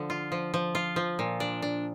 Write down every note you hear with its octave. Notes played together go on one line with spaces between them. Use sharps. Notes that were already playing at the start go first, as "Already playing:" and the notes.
Already playing: D3 F3
F4
F3
F3
F4
F3
A#2
D4
D4